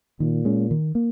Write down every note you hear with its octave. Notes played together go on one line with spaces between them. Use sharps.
A#2 D#3
G#3 C#4
D#3
A#3